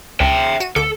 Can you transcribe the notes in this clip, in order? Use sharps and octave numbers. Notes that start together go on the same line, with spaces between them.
C#2 E5 G5
F#4 D#7 E7
D2 A4 D6